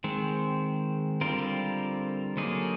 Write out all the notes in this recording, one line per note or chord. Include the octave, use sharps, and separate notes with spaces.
D#3 G#3 C4
D3 G3 C4 F4 A#4
D3 F#3 A#3 D#4 G#4